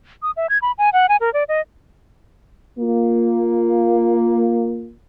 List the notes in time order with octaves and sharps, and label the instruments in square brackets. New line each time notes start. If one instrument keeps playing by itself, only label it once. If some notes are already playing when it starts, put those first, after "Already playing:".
[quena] D#6
E5
G#6
B5
G#5
F#5
G#5
A#4
D5
D#5
[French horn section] A#3 F4